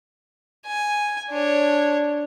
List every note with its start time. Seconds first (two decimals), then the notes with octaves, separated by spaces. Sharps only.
0.66 G#5
1.30 D4 C#5